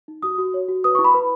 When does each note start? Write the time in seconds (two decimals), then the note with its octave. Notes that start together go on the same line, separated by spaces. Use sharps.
0.08 D#4
0.23 F#4 D#6
0.38 F#4
0.54 C#5
0.69 F#4
0.84 B4 D#6
0.95 C#6
0.99 E4
1.04 B5
1.14 B4